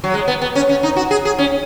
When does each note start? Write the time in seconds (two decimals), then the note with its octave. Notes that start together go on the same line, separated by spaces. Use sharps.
0.04 F#3
0.14 G#3
0.28 B3
0.42 B3
0.55 C#4
0.69 C#4
0.83 D#4
0.97 F#4
1.11 G#4
1.25 G#4
1.39 C#4